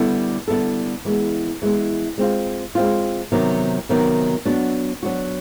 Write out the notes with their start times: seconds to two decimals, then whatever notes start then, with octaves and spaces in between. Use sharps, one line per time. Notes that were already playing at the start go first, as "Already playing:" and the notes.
Already playing: D3 G3 B3 E4 A4
0.48 D3 G3 B3 E4 A4
1.05 E3 G#3 B3
1.62 E3 G#3 B3
2.18 G#3 C4 F4
2.75 G#3 C4 F4
3.32 C3 D#3 F#3 B3
3.89 C3 D#3 F#3 B3
4.45 F#3 B3 D4 F#4
5.03 F#3 B3 D4 F#4